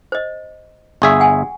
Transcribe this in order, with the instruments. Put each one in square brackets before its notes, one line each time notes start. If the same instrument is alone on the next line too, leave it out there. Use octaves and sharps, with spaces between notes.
[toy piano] C5 D#5
[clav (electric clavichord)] G1 G#4 E5 [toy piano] C#6
[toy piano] F#5 G#5